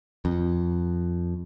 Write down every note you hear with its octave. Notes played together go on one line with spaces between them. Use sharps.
F2